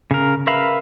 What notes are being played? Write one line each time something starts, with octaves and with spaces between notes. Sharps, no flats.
C#3 A#4
A#4 B4 E5 F5 B5